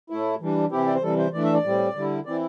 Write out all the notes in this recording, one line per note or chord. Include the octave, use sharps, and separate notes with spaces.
A2 A3 E4
E3 G3 D4
C3 E3 C4 E4 G4
D5
C5
C3 E3 G3 A4
C5
E3 A3 D4 D5
E5
D5
A2 G3 C4
D3 G3 E4
E3 C4 E4 D5